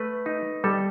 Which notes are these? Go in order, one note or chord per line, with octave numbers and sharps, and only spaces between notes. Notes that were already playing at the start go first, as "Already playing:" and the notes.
Already playing: A3 B4
D#4
G3 A4